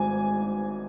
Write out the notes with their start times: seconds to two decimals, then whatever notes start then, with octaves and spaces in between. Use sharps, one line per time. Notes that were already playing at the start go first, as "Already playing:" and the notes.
Already playing: G#1 G#2 G#5